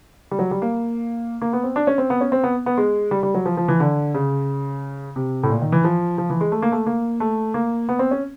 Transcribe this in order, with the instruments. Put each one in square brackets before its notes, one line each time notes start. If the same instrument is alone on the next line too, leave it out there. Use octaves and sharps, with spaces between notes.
[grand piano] G3
F#3
G3
A#3
A#3
B3
C4
D4
C#4
C4
B3
C#4
C4
B3
B3
G#3
G3
G3
F#3
F3
F3
E3
D3
C#3
C3
A2
A#2
D#3
E3
F3
F3
E3
G#3
A3
A#3
A3
A#3
A3
A#3
B3
C4
C#4